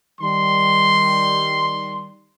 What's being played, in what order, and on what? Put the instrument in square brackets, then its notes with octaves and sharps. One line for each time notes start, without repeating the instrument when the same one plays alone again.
[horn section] D#3 G3 C6